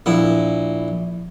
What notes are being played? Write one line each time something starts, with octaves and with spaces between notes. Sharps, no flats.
A#1 E4